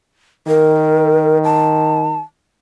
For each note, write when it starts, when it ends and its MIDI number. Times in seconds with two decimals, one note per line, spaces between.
0.47 2.20 51
0.47 1.38 70
1.44 2.19 81